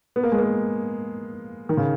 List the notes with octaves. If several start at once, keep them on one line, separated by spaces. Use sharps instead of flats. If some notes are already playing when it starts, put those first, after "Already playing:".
B3
A#3
G#3
A#3
D#3
C#3